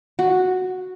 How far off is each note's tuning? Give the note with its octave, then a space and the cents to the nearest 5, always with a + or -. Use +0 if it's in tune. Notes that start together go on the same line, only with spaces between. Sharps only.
F#4 -5